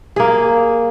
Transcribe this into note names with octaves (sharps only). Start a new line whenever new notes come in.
A#3 G#4